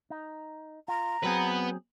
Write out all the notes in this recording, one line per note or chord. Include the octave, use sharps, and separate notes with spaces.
D#4
F4 A#5
F#3 B3 C4 G#4 B4